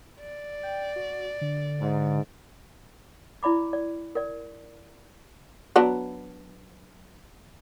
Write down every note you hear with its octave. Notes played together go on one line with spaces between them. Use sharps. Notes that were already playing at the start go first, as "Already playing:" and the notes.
D5
G5
F#4
D3
G#2
E4 D5 B5 D6
D5
A#4 D5
F#3 B3 D4